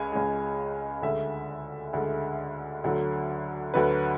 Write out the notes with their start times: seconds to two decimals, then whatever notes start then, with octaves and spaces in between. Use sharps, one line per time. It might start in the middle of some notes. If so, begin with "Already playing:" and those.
Already playing: C#2 C#3 G#3 G#5
0.12 C#2 C#3 G#3
1.02 D2 D3 G#3 E5
1.93 D2 D3 G#3
2.84 D2 D3 F#3
3.74 D2 D3 F#3 B4